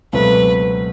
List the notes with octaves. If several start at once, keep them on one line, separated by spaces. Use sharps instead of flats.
C#2 B2 F#3 A3 C4 B4